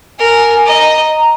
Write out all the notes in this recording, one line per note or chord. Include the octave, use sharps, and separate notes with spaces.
A#4 G#5
D#5 A#5